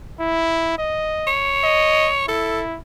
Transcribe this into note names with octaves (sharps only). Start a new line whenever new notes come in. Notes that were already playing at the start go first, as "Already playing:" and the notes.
E4
D#5
C#5
D#5
E4 A4